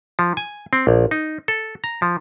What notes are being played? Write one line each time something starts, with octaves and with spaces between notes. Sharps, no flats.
F3
G#5
C4
A#1
D#4
A4
A#5
F3